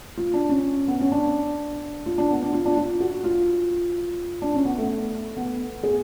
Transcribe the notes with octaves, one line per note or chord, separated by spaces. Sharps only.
F4
D4
C#4
B3
C#4
D4
F4
D4
B3
D4
F4
D4
F4
F#4
F4
D4
C#4
B3
A3
B3
G#4